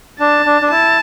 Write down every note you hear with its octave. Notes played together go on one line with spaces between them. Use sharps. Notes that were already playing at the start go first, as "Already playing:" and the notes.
D4 A5
D4
D4
E4 A5